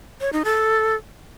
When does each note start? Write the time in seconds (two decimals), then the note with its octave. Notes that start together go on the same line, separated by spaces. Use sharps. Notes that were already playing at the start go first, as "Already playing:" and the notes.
0.21 C#5
0.33 D#4
0.45 A4